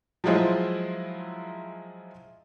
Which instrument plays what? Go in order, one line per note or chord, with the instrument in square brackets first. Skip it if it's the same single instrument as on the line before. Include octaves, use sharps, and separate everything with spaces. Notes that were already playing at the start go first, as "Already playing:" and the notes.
[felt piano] F3 F#3 G#3 E4 F4 C5